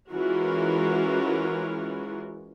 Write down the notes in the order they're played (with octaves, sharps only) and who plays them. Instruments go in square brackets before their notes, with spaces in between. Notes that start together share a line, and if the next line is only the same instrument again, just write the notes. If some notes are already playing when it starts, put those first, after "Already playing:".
[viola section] E3 G#3 C#4 F4 F#4 A#4